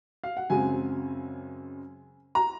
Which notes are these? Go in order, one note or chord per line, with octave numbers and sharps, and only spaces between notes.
F5
F#5
F#2 C#3 G#3 C4 G#5
A#5